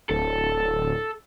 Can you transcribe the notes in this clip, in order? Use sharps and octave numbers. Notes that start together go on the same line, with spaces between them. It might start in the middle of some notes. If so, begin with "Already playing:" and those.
D1 A4